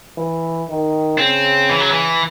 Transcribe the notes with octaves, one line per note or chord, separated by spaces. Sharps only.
E3
D#3
C#3 C4
E3
F#3
E3